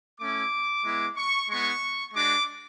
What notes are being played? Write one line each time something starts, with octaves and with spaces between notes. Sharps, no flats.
A3 C#4 E4 D6
G#3 B3 E4
C#6
G#3 B3 E4 C#6
G#3 D4 F#4 D6